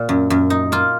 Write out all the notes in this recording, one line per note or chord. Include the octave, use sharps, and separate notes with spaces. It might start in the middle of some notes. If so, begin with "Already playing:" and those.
Already playing: A#2
F#2
F#2
D#4
A#3 F4